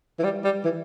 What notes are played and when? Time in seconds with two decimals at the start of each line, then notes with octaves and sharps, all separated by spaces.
0.19 E3
0.24 G3
0.44 G3
0.65 E3